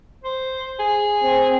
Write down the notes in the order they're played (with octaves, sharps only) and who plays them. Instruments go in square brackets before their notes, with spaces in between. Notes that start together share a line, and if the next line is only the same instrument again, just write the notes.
[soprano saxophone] C5
G#4
[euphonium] C4